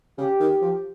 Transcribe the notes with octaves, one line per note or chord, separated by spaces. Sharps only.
C#3 G4
D#3
F3